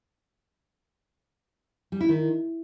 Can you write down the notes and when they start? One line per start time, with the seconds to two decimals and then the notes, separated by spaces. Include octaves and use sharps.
1.92 G3
2.01 E4
2.09 D#3